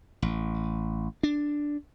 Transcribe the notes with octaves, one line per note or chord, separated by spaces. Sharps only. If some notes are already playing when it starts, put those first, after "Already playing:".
A1
D4